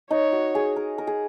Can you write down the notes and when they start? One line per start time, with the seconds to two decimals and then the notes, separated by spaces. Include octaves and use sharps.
0.11 D#4 C#5
0.32 F#4
0.55 G#4
0.76 A#4
0.98 A#4
1.07 G#4